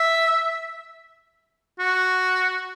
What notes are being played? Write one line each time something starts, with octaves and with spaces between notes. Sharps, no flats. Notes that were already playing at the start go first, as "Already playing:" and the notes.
Already playing: E5
F#4